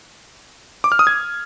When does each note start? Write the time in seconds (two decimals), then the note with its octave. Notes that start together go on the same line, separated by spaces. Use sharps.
0.84 D6
0.92 F6
0.99 D#6
1.07 G#6